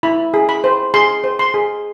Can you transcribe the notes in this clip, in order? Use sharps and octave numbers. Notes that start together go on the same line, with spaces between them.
E4 B5
G#4
B5
C5
G#4 C6
C5
C6
G#4